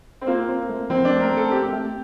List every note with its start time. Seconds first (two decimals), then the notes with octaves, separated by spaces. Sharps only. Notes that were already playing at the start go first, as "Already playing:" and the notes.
0.21 C4
0.27 A#3 F4
0.49 C4
0.69 A3
0.90 F3 C4
1.05 D4
1.10 A3
1.20 A#4
1.32 A3
1.37 A4
1.51 C4 G4
1.73 A3